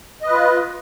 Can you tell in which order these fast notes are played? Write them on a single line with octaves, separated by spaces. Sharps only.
D#5 B4 F4